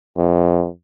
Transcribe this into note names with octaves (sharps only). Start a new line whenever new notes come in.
F2